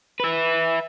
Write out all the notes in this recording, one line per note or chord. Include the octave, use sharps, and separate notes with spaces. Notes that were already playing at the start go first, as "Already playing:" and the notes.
B4 E5